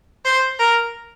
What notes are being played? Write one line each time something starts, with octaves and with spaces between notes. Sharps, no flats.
C5
A#4